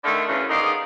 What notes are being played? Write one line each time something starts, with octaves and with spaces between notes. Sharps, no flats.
D3 D#3 A3
F#2 C#3 E3
G#2 D#3 B3 D#4 D5 F5